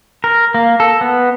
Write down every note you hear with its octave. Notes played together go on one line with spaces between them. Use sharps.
A#4
A#3
A4
B3